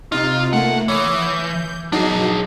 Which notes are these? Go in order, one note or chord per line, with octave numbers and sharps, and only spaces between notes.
C3 D#4 F4
A3 A#3 F#5
E3 C#5 D#6
G6
F#3 D4 D#4 G#4